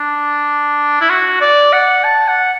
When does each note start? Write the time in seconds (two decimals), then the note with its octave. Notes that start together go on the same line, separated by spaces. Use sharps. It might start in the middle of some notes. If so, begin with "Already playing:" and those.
Already playing: D4
1.01 E4
1.10 F#4
1.41 D5
1.73 F#5
2.04 A5
2.28 F#5